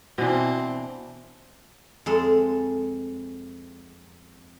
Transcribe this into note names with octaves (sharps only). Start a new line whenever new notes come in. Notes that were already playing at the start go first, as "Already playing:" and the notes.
B2 E3 C4 D4
F2 G#3 A4